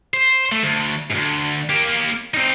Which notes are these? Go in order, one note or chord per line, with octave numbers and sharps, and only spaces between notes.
C5
A3
D2
D2 G#2
A#3 G4
C4 D#4